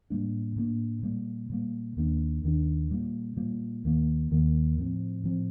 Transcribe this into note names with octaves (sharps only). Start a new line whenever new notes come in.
A2 G3 A#3 D4
A2 G3 A#3 D4
A#2 G3 A#3
A#2 G3 A#3
D#2 D#3 A#3 D4
D#2 D#3 A#3 D4
A#2 G3 A#3
A#2 G3 A#3
D#2 D#3 A#3
D#2 D#3 A#3
A2 F3 C4
A2 F3 C4